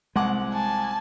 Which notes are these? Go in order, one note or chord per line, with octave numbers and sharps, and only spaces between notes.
C2 G#3 F#5 D6
G#5 A5